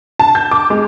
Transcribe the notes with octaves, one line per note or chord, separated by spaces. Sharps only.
A5
G6
D6
G#3